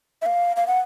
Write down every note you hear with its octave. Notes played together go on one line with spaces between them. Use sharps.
E5
F5
F5
F#5